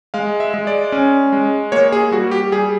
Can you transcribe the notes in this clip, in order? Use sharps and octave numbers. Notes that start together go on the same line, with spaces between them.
G#3 F5
E5
G#3
D5
C#4
G#3
A#3 C#5
G#4
G3 F#4
G4
G3 G#4